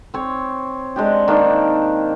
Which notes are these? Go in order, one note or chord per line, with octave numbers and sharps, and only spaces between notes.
C4 C#5
G#3 D4 G4
D#3 A#3 D4